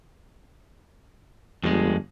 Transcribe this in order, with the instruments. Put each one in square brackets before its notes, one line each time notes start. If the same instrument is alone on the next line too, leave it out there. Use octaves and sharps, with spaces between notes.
[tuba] G1 [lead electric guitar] F2 G#3